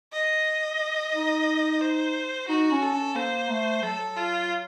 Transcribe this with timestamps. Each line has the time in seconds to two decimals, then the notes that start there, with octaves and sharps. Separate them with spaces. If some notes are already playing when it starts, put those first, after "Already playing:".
0.13 D#5
1.14 D#4
1.81 C5
2.48 D#4 F#4
2.71 C#4
2.82 A4
2.93 C#4
3.15 A#3 C5
3.49 A3
3.83 F#3 A4
4.17 F4